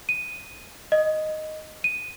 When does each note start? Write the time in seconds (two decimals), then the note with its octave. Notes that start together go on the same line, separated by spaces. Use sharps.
0.09 D#7
0.92 D#5
1.84 D#7